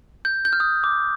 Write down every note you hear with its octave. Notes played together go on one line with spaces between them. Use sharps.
G6
G6
F6
D#6
D6